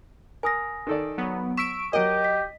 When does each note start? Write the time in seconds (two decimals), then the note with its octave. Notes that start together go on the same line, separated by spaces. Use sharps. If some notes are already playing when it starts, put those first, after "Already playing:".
0.43 A#4 G#5 D#6 A#6
0.87 D#3 A4 D5
1.18 F#3 B3
1.57 C#6 E6 B6 D7 E7
1.93 F#3 F#4 G4 A#4 D#5 D7
2.24 B6